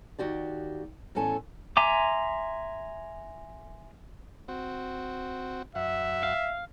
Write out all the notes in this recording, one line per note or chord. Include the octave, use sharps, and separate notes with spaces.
D#2 F#4 G4 D5
E2 A2 C#4 A4 G#5
E5 G#5 A#5 C6 D6
C4 F#4
F#2 E5 F#5
F5